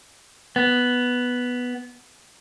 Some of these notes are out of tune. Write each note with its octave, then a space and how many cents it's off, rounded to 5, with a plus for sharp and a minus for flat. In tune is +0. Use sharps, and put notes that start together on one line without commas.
B3 +0